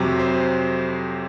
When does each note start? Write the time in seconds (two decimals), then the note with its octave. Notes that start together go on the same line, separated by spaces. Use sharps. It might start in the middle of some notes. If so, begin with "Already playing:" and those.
Already playing: F2 C3 F#3
0.20 C5